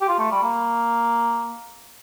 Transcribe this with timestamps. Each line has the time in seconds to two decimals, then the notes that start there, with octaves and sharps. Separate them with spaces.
0.01 G4
0.08 F4
0.19 A3
0.32 G3
0.43 A#3